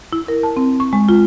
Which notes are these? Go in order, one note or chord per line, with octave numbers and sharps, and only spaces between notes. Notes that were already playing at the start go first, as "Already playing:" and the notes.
E4
A#4
A5
C4
C#6
G#3
F4